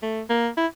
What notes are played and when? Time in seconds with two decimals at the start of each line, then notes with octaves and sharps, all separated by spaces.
0.02 A3
0.29 A#3
0.57 E4